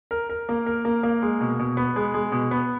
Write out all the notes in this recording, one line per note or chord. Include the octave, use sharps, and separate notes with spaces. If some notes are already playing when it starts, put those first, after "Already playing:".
A#4
A#4
A#3
A#4
A#3
A#3
G#3
B2
B2
B3
G#3
G#3
B2
B3